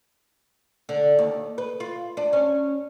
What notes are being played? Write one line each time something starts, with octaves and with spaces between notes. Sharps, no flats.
D3
D#2
B4
F4
D4
C#4